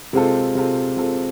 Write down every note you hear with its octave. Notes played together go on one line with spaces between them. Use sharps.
C3 G#3 C4 F4 A4
C3 G#3 C4 F4 A4
C3 G#3 C4 F4 A4